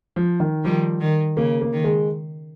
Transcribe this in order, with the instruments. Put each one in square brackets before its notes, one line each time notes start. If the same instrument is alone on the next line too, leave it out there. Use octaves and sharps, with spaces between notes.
[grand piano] F3
D#3
[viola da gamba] D#3 G3 [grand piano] F3
[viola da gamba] D#3
[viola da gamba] C#3 [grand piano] A#3
[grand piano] A#3
[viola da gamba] D#3
[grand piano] G#3